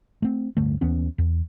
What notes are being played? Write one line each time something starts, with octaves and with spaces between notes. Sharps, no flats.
A3 C4
D1 G2 D3 A3
D#2 E3 B3 C#4
E2